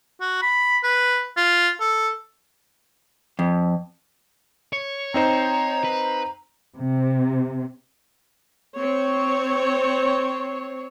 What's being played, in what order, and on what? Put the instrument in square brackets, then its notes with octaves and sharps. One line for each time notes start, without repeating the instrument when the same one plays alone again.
[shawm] F#4
B5
B4
F4
A4
[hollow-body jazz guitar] F2
[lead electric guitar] C#5
[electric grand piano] C4 D#4 C5 [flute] A#5
[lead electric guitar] B4
[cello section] C3
[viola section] C4 C#5